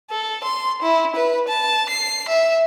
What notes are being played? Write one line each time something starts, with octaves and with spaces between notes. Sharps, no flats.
A4
C6
E4
B4
A5
C7
E5